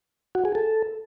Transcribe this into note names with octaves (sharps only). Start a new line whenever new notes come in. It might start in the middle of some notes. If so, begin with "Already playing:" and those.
F#4
G#4
A4